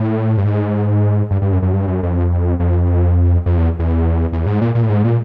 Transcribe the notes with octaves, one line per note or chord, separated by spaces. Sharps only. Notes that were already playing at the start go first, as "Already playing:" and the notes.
Already playing: A2
G2
G#2
G2
G2
F#2
F#2
G2
F#2
F2
F2
F2
E2
E2
E2
G#2
A#2
A#2
A2
G#2
A#2